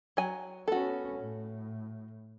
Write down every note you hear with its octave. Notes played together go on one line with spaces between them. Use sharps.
F#3 G#5
B3 C#4 F#4 A4
A2